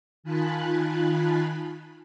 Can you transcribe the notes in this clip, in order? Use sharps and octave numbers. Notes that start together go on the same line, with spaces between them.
D#3 F4 G#5 A5 B5 F#6